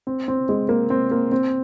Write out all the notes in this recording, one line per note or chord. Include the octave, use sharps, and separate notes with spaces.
C4
C4
G#3
A#3
C4
A#3
C4